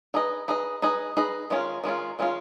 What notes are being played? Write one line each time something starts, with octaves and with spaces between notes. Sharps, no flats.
D#4 G#4 B4 D#5
D#4 G#4 B4 D#5
D#4 G#4 B4 D#5
D#4 G#4 B4 D#5
D#3 G#3 C#4 F4
D#3 G#3 C#4 F4
D#3 G#3 C#4 F4